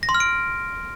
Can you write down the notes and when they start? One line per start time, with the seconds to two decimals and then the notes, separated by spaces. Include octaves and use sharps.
0.03 A#6
0.09 C6
0.15 F6
0.20 D7